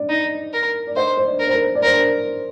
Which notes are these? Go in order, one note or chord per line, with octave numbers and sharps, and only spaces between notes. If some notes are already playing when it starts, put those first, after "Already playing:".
Already playing: D5
D#4
A#4
D5
C5 D#5
C5
D5
A#4
C5
A#4
D5
A#4 C5